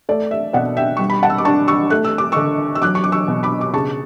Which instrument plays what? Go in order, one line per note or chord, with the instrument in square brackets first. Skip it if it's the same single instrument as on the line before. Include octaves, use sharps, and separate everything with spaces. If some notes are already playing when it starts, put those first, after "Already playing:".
[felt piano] A3 D5
E5
B2 D5 F#5
E5 G5
G3 C#6
B5
F#5 A5
E6
D6
D4 A5 C#6
C#6 E6
A3 F#6
E6
D6
D3 C#6 E6
E6
F#3 D6 F#6
C#6
D6
C#6 E6
B2
B5 D6
D6
C#3 A5 C#6